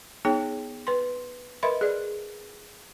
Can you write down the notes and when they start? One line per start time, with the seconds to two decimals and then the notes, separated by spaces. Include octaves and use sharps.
0.25 B3 D#4 G#4 C#5 G5
0.87 B4 C6
1.63 A#4 B4 D#5 E5 B5 C6
1.81 G#4 D5